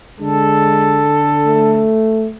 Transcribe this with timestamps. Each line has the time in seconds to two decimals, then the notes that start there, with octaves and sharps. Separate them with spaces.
0.20 D3 G#3 A4
1.47 A3